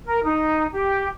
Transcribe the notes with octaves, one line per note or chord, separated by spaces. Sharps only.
A#4
D#4
G4